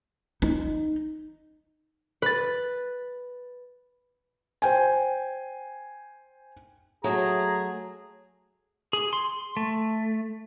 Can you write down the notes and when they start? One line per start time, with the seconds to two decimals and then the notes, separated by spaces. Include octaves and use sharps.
0.42 D#4
2.22 B4 A6
4.62 C5 G5 G#5
7.04 F#3 A3 G#4 A#5
8.93 G#4
9.13 C6
9.57 A3